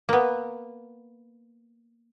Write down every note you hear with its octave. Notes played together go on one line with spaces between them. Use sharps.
A#3 B3